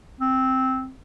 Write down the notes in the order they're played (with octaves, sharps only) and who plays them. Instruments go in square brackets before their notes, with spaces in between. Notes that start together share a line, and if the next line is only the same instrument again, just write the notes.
[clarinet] C4